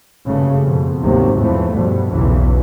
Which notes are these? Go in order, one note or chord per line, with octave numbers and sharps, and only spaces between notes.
F#1 G2 C#3 A3
F2 B2
G#1 D2 C3 D#3 F#3 A#3
E2 A2 E3 F3 A3
D2 G2 B2
B1 E2 C#3 E3